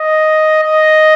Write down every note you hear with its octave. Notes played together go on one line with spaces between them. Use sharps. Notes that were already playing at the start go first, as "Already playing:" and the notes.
Already playing: D#5
D#5